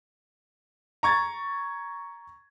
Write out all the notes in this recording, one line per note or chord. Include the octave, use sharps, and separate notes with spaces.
A#5 C#6 G#6 A6